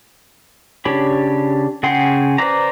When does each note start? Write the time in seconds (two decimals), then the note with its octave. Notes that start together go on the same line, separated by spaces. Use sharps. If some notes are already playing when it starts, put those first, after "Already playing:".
0.85 C#3 D4 G4 C#5 B5
1.83 C#3 G#4 F#5 G5 C6
2.38 B4 C5 D5 A#5